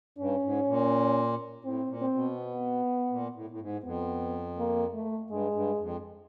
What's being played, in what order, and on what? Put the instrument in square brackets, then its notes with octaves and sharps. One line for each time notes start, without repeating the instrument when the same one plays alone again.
[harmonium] G2 [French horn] C#4
[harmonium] G#2
A#2
[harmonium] A2 [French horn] C4
[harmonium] A#2
[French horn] C4
[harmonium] B2
[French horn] B3
[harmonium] A#2
A2
A2
G#2
[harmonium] F2 [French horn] B3
[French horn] A#3
A3
[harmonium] G2 [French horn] G#3
[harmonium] G2
F2